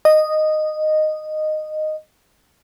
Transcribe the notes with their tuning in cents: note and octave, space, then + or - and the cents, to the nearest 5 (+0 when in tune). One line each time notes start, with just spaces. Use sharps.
D#5 -10